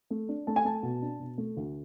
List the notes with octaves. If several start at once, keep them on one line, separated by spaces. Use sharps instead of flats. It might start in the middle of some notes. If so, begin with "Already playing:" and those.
A3
D4
A3 A5
G#5
A3 A5
B2
D4
B2
A3
D2